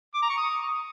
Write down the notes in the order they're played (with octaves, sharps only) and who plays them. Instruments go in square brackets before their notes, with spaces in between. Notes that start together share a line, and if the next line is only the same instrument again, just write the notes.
[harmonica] D6
A#5
C#6
D#6